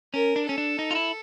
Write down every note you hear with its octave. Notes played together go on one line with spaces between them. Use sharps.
C#4 A#4
D4
C#4 A4
D4
D#4
F4
E4